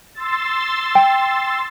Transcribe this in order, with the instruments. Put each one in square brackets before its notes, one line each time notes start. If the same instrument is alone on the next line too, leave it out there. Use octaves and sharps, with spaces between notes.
[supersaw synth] C6 E6 A6
[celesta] G5